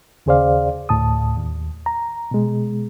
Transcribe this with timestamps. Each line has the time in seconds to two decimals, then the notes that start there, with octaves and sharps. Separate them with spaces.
0.26 D#2 C#3 G#4 C5 D5 F5
0.89 D2 A2 A5 D#6
1.37 D#2
1.86 A#5
2.31 B2 G#3